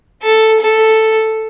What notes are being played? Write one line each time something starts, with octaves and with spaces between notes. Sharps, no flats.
A4
A4